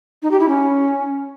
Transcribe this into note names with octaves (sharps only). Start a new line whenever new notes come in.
D#4
G4
E4
C#4